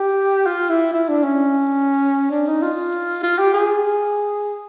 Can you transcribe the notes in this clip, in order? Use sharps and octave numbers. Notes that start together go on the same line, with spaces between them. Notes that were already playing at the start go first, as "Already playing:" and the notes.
Already playing: G4
F4
E4
E4
D4
C#4
D4
D#4
F4
F4
G4
G#4